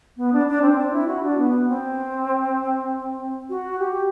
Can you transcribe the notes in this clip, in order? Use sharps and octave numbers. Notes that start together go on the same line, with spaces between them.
B3
D4
D4
C4
D4
E4
F#4
D4
B3
C4
F#4
G4